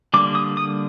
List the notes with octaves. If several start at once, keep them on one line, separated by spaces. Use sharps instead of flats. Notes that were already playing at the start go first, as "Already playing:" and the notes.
D3 G3 A#3 D6
D#6
D#6